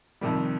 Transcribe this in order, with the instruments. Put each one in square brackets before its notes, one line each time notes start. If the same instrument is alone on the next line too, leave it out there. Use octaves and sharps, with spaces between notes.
[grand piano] F2 C3 D#3 G3